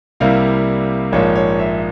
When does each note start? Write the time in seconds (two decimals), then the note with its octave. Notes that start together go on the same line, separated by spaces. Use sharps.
0.20 C2 C3 G3 A#3 E4 F5
1.12 A#1 G#2 F3 A#3 C#5
1.35 C#5
1.59 E5